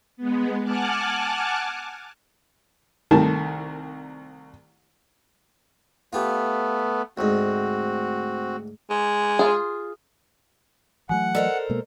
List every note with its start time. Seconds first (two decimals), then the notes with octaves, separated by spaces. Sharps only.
0.17 G#3 B3
0.64 F#5 G#5 A5 D6 F6 F#6
3.11 C2 D#3 A3 A5
6.13 A3 B3 F4 G4
7.18 D2 G#2 C4 F#4
8.90 G#3
9.39 F4 G#4
11.09 E3 F#3 A3 F#5 G#5
11.35 A4 A#4 C5 D5 D#5
11.70 B2 G#3 A#3